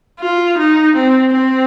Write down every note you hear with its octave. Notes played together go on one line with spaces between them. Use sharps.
F4
D#4
C4
C4